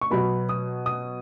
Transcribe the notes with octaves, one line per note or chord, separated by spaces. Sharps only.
C#6
B2 F#3 B3 B5
D#6
D#6